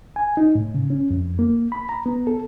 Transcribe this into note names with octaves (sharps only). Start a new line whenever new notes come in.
G#5
D#4
A2
C#3
C#4
F2
A#3
B5
A#5
B3
A4